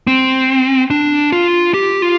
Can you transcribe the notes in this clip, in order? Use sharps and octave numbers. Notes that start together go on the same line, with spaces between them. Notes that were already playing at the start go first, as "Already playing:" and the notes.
C4
D4
F4
G4
F4